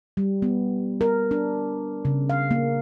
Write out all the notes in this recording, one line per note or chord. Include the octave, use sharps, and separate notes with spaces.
G3
B3
A#4
D4
C#3
F5
A#3